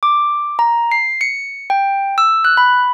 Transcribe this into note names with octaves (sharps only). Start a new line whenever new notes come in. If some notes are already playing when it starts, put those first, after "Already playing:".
D6
A#5
C7
C#7
G5
E6
F#6
B5